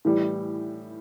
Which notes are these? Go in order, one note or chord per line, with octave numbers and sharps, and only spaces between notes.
A2 E3 G3